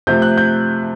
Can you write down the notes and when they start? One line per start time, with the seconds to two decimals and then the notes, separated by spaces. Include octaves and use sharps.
0.07 C3 F3 A3 G6
0.22 F#6
0.37 G6